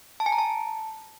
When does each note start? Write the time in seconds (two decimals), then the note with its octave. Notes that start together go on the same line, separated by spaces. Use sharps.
0.20 A5
0.26 G#5
0.32 A#5
0.38 A5